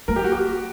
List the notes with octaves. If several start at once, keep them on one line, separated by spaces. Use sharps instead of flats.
A#3 A#4
G4
F#4
G4